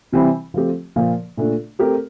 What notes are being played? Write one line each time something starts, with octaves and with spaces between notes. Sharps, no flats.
C3 E3 G3 C4 E4
F3 A3 C4 G4
A#2 F3 A#3 F4 A#4
A#2 A3 D4
A3 C4 G4 A#4